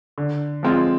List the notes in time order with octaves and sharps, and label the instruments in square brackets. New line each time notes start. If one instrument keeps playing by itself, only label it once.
[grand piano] D3
F3 G#3 C4 F4